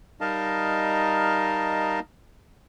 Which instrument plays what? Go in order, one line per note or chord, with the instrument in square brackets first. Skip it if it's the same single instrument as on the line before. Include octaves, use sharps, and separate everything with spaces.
[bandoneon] G3 D#4 A#4 D#5 F5 A5